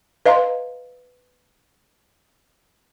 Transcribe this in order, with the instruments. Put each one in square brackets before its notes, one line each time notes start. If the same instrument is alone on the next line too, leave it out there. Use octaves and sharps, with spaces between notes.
[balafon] B4 D#5 F5 A#5 C6